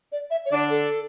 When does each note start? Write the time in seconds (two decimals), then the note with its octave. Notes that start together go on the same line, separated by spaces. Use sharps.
0.12 D5
0.31 E5
0.46 C#5
0.51 D3 D4 D5
0.70 A4